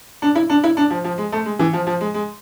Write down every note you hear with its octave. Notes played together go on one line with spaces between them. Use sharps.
D4
E4
D4
E4
D4
F3
F3
G#3
A3
G#3
E3
F3
F3
G#3
G#3